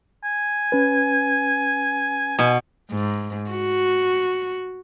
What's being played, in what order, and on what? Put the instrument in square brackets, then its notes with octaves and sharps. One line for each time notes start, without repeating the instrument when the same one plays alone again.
[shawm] G#5
[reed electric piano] C#4 B4
[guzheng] B2 [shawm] G#5
[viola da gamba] G#2
F#4